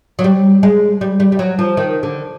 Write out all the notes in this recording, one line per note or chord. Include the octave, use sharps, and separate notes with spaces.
F#3
G3
G#3
G3
G3
G3
F#3
F3
D#3
D3